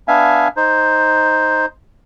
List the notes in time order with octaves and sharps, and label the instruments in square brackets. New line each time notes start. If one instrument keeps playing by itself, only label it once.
[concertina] B3 D4 E5 F5 G#5
D#4 C5